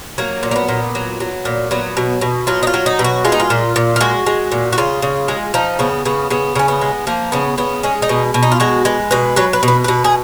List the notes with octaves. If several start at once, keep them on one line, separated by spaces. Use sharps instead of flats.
F#3 A#3
A#2
A#3
B3
A#2
F#3
F#3
A#2
F#3 B3
B2
B2
F#3 F4
D#4
F4
F#3
D#4
B2
F#4
G#3 F4
D#4
F4
A#2
A#2
F4
G#3 F#4
G#3
A#2
F#4
C#3 F4
C#3
G#3
F3 D#4
C#3 B3
C#3 B3
C#3 B3
C#3 C#4
B3
G#3
F3 A#3
C#3 B3
C#3 B3
G#3 C#4
D#4
B2
B2
D#4
F4
G#3 F#4
G#3 B4
B2 B4
F#3 B4
B4
B2
B4
B2 B4
G#4